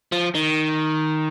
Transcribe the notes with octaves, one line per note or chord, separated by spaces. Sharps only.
F3
D#3